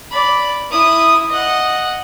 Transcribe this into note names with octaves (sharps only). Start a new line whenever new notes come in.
D5 B5
E4 D#6
D#5 F#5